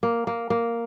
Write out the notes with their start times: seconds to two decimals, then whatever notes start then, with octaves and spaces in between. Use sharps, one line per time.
0.03 A#3
0.27 A#3
0.50 A#3